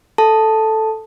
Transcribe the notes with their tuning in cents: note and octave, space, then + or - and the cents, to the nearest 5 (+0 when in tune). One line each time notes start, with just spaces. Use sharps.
A4 +0 A5 +0